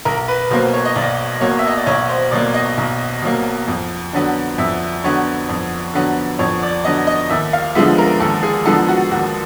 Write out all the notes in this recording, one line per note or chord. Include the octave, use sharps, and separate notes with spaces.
B1 A#4
B4
B2 F#3 A#3 C5
C#5
D#5
B1 D5
B2 F#3 A#3 C#5
E5
D#5
D5
B1 C#5
C5
B2 F#3 A#3 D5
D#5
B1
B2 F#3 A#3
F2
D3 F#3 B3
F2 E5
D3 F#3 B3 C#5
F2
D3 F#3 B3
F2 C#5
D5
D3 F#3 B3 D#5
D#5
D#2 E5
F5
D3 F3 G#3 B3 E5
A#4
D#2 A4
G#4
D3 F3 G#3 B3 A4
F#4
D#2 F#4